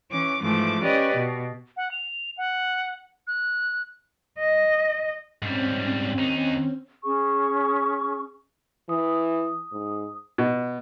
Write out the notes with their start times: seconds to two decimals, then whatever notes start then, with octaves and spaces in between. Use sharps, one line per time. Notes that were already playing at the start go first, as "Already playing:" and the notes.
0.11 E3 C#4 D6
0.42 G#2 E3 F3 A3 D6
0.83 C#4 G4 B4 D5 D#5
1.16 B2
1.77 F#5
1.91 F7
2.38 F#5
3.27 F#6
4.39 D#5
5.42 G#2 G3 C4 C#4
6.18 D#2 D#4
7.04 C#4 G#4 C#6
8.89 E3 D#6
9.72 G#2
10.38 B2